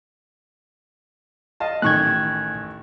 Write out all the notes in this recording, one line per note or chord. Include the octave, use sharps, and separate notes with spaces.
D#5 F5 A5
A1 D#3 C#6 F#6 G#6